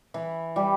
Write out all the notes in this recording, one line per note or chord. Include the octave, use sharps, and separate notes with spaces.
E3 E4
G3 G4